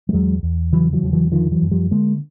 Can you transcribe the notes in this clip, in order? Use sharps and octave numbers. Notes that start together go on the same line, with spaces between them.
G3
E2 F#3 G#3
E2
C#3 E3 F#3
E3 F#3
E2 F3
E3 F#3
D3 D#3 F3
E3 F#3
F#2
F3 G3
D3 G#3 A#3